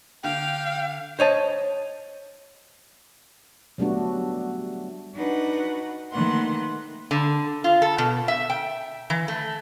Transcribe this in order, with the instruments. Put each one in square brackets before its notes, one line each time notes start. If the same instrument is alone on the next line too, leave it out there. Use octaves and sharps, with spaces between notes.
[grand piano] D3 [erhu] F5 [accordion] G5
[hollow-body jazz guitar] C5 C#5 D#5 A5
[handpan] F#3 G3 A3 B3 D4 F#4
[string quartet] D4 D#4 F#4 B4 F#5
D#3 A3 A#3 B4 F#5 C6
[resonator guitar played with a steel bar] D3
F4
A4
B2
E5
G5
E3
A3